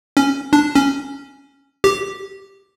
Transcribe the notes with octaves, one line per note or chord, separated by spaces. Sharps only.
C#4
D4
C#4
G4